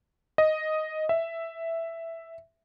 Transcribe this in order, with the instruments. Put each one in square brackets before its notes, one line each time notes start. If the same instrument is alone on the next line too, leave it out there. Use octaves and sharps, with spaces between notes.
[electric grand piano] D#5
E5